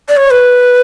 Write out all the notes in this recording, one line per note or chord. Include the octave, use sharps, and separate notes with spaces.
D5
C#5
B4